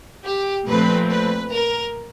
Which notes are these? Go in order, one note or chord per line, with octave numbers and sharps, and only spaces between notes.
G4
A#2 F3 A3 C4 B4
B4
A#4